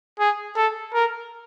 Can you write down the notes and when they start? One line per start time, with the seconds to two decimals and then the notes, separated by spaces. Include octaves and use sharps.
0.19 G#4
0.56 A4
0.94 A#4